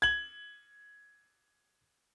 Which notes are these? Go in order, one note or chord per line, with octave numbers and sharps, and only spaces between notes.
G#6 F#7